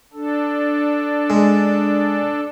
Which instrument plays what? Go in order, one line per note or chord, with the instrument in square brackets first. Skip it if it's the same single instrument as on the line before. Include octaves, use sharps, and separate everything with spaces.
[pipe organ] D4 A4
[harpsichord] G#3